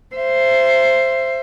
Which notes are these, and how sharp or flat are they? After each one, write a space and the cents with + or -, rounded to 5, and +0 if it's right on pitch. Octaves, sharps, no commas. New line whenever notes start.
C5 +0 E5 +30